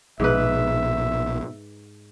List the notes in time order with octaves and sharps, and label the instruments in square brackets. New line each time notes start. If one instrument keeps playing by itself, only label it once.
[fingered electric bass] A#1 B2 [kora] G#2 B4 [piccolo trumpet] E5